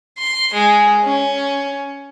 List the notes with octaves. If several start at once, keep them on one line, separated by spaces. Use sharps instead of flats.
C6
G#3
C#4